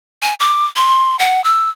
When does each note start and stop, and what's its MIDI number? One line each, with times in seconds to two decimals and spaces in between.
0.22 0.34 80
0.40 0.65 86
0.76 1.18 84
1.19 1.44 78
1.44 1.69 88